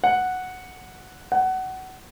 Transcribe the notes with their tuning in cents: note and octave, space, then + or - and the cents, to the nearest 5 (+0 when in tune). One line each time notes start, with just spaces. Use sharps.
F#5 -5
F#5 +20